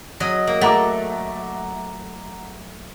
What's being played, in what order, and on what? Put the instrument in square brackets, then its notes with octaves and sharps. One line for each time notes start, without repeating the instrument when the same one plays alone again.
[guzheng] F#3 D#5
A#3
[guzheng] A3 [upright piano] F#5 A#5 D6